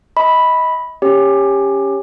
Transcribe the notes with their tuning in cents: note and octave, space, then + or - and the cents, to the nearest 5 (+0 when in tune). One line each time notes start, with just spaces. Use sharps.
D#5 +35 B5 +0
C#4 +0 G4 +20 C#5 +0